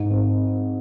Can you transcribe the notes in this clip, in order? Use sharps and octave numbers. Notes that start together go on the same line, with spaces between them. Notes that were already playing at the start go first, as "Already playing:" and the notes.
Already playing: G#2
C4